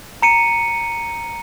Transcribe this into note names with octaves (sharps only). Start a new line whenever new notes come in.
A#5 C#7 D#7